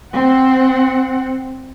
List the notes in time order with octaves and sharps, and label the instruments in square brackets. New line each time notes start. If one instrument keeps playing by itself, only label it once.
[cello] C4 F#5